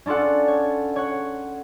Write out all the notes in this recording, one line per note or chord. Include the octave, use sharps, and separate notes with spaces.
C#4 D4 F4 A4 F#5
C#5
C#5 F#5